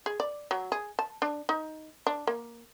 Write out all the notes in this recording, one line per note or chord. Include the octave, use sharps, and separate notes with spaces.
G#4
D5
F#3
G#4
A5
D4
D#4
D4
A#3